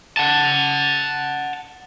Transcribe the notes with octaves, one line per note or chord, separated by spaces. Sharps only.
F#5 A5